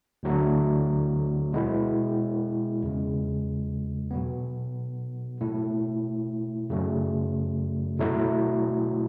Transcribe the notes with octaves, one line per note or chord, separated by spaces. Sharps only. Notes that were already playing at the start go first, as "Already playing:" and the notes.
D2 D3 F#3 A3
B2 G#3 B3 E4
E2 C#3 G#3
B2 F#3 B3
B2 A3 E4
F#2 C#3 F#3 A3
B2 F#3 A3 E4